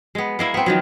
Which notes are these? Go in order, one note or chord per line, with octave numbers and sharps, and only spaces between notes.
G#3 B3
G#3 A#3 E4
B3 C4
D#3 F3 F#3